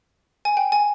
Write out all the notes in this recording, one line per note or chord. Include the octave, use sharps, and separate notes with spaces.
G#5
G5
G#5